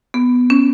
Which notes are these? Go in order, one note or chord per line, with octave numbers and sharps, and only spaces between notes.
B3
C#4